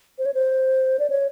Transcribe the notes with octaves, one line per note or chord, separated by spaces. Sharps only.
C5
C#5
C5
D5
C#5